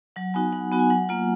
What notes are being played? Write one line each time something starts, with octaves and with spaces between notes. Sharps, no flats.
F#3 F#5
B3 D#4 F#4 G#5
F#3 F#5
B3 D#4 F#4
G#5
F#3 F#5
A#3 F4 F#5